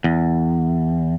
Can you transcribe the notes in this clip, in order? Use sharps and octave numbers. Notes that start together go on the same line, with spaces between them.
E2